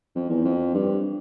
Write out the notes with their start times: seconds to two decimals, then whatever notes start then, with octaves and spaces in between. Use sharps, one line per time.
0.15 F2
0.29 E2
0.45 F2
0.74 G2